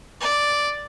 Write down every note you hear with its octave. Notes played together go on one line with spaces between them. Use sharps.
D5